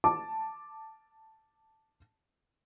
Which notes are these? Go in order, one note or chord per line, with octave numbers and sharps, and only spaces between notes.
A5 D6